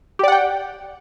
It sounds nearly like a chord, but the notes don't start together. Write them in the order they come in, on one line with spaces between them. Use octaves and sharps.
G4 D5 F#5 G5